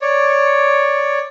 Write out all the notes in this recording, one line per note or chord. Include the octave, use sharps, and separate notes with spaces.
C#5 D5